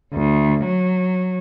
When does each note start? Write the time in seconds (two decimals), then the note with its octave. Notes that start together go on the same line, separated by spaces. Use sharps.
0.14 D2
0.64 F#3